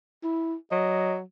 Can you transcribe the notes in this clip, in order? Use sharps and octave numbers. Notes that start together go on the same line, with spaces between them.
E4
F#3 D#5